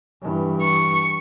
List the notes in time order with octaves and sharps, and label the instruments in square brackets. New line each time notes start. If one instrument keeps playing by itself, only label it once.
[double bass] G2 E3
[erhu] C#6